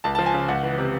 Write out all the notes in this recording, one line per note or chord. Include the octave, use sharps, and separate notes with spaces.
C#2 A5
A5
F3
G#5
C#3
C#2 F#5
E3
C3